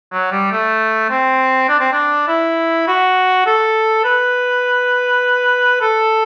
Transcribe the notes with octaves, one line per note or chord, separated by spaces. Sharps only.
F#3
G3
A3
C4
D4
C4
D4
E4
F#4
A4
B4
A4